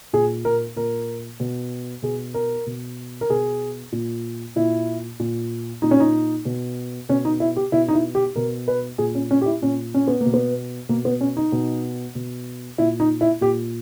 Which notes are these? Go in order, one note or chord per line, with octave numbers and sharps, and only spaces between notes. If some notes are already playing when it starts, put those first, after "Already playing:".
A#2 G#4
A#4
A#2 A#4
B2
B2 G#4
A#4
B2
A#4
B2 G#4
A#2
A#2 E4
A#2
A#2 D#4
C#4
D#4
B2
B2 C#4
D#4
E4
G4
B2 E4
D#4
E4
G4
B2 A#4
B4
A#2 G#4
C#4
C#4
G4
E4
A#2 C#4
C#4
B3
A#3
B2
B3
B2 A#3
B3
C#4
D#4
B2
B2
A#2 E4
D#4
E4
A#2 G4